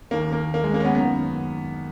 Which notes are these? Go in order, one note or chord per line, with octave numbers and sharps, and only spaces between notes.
D#2 D#3 A#3
A#3
A#3
G#3
A#3
C#4
B3
F#2 D#3 B3